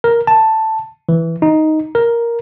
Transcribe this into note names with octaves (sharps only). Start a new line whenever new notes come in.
A#4
A5
E3
D#4
A#4